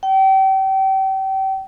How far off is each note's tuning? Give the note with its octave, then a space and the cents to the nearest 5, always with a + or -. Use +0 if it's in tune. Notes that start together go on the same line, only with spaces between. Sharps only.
G5 -35